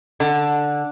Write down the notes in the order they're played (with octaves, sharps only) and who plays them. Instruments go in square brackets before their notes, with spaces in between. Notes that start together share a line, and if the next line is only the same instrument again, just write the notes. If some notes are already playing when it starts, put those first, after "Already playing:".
[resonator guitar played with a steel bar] D3